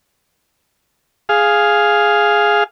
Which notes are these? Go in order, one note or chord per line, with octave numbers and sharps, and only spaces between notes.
G#4 F5